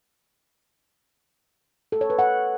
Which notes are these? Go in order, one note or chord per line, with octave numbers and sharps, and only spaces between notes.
A4
C#5
B4
F#5